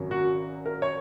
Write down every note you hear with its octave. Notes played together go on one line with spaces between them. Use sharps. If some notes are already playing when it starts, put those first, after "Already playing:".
Already playing: G#1 F#2 C#3 F#3
F#4
A#4
C#5